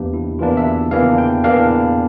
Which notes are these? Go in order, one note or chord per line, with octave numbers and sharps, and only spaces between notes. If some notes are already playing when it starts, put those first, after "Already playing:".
Already playing: E2 E3 A#3 D4 G4
E4
E2 E3 A#3 D4 F4
E5
E2 E3 A#3 D4 F5
G5
E2 E3 A#3 D4 F5